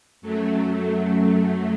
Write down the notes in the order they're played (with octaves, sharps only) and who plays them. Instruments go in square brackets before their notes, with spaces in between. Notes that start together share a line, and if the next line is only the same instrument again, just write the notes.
[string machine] F#2 F#3 A3